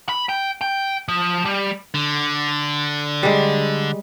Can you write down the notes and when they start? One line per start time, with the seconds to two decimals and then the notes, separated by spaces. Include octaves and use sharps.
0.09 B5
0.29 G5
0.61 G5
1.08 F3
1.45 G3
1.94 D3
3.23 G3 G#3